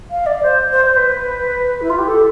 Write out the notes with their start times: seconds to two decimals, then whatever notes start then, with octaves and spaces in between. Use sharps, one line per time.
0.10 F5
0.26 D5
0.43 C5
0.72 C5
0.84 C5
0.96 B4
1.81 E4
1.90 F4
1.98 G4
2.07 A4